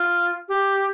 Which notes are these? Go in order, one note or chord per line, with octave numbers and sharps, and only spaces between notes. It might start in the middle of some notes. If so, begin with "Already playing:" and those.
Already playing: F4
G4